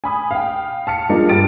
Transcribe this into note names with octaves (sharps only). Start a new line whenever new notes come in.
G#5 B5 D#6
F5 G5
A5 F6 C#7
F3 G3 G#3 A#3 D4
G2 G4 A6 D7